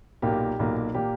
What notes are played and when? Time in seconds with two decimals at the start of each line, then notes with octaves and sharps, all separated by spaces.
0.22 B1 A#2 A#3 G4
0.59 B1 A#2 A#3
0.94 A#2 A#3 G4